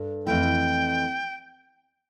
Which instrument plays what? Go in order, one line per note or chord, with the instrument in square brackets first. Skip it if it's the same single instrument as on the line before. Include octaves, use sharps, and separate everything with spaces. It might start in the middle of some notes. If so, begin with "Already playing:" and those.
Already playing: [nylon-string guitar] G2 D4 A4
[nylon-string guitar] F2 E3 A3 E4 [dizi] G5